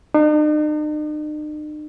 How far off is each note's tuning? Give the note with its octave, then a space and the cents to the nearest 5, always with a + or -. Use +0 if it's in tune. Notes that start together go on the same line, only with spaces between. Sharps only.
D#4 -45